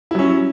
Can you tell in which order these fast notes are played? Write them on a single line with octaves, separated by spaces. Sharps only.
E4 F#3 C#4